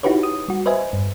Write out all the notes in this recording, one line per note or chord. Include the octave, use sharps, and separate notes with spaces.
D#4 E4 F#4 G4 B4 C#5
D#6
G3 F#4
B4 C5 D#5 E5 G#5
G2